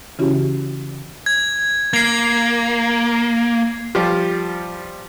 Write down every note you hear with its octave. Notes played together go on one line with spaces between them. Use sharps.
C#3 E3 C#4 E4 F#4 G4
G#6
A#3 G#6 C7
F3 G3 F4 G4